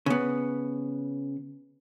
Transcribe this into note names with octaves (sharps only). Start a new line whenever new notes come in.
C#3 B3